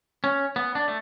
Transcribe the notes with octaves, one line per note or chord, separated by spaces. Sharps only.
C#4
B3
D4
A3